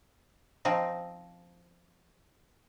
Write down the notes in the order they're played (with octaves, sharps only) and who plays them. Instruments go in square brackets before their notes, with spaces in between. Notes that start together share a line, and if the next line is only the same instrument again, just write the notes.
[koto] F3 C4 D#4